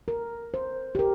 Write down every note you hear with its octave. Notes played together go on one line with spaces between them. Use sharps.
A#4
C5
G4
A#4